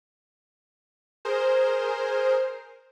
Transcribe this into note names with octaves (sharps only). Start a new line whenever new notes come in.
G#4 A#4 C5